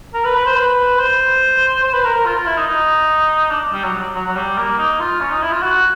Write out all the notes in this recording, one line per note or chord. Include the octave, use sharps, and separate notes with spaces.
A#4
B4
B4
C5
B4
C5
C5
B4
A#4
A#4
F4
F4
E4
D#4
D#4
D4
G3
F#3
F#3
F#3
G3
A#3
D#4
F4
C#4
D#4
E4
F4
F#4